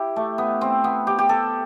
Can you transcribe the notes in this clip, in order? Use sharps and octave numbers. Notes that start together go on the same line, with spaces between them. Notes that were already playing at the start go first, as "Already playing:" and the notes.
Already playing: E4 G4
A3
B3
C4
B3
G4
G4
A4